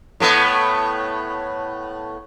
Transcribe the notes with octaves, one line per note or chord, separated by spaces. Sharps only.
A2 A3 B3